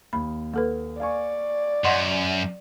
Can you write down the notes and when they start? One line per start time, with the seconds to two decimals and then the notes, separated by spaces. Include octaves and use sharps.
0.13 D#2 B5
0.54 A#3 A4 B4
1.00 D5 F5 G#5 C#6
1.85 F#2 D#5 F#5 C6